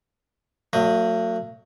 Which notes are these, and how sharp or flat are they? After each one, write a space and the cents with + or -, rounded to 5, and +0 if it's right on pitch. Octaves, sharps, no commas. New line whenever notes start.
F#3 -20 A3 +45 D#5 +0